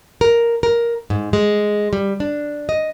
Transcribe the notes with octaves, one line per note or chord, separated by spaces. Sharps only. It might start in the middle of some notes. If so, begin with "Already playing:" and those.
A#4
A#4
G#2
G#3
G3
D4
D#5